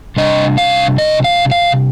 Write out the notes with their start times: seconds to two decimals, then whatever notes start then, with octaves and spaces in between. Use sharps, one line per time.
0.17 C3 G3 D4 D#5
0.58 F5
0.98 D#5
1.24 F5
1.51 F5